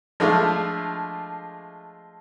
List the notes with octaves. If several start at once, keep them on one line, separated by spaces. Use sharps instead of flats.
F3 G#3 A3 D4 E4 F4